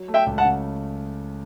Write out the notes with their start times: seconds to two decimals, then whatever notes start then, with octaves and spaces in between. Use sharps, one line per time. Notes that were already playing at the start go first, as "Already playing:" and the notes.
Already playing: F#3
0.08 A3
0.14 E5 G5
0.26 C#2
0.38 F#5 A5
0.45 C#3